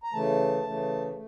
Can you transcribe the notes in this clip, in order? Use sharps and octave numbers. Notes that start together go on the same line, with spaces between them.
A#5
C#3 E3 A3 A5
C#3 E3 A3
A3